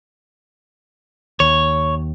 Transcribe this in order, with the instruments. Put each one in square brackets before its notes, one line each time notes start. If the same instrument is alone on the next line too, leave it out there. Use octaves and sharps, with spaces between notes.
[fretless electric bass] D#2 [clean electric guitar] C#5